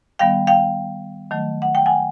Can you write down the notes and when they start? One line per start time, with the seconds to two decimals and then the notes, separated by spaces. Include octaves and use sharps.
0.19 D#3 G3 B3 F5 G5
0.47 F5 G5
1.31 D#3 F#3 A3
1.62 F#5
1.75 G5
1.86 F#5 G#5